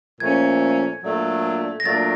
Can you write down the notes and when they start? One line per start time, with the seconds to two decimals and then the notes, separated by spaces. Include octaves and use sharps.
0.20 A#2 F3 A3 C#4 G#6
1.03 A#2 F#3 A3 D4
1.80 A#6
1.85 A#2 F#3 A3 D4 A6